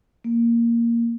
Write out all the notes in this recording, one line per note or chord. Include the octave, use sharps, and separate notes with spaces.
A#3